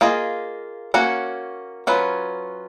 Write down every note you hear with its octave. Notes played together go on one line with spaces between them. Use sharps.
A#3 F4 G#4 D#5
A#3 C#4 F#4
F#3 C#4 F4 B4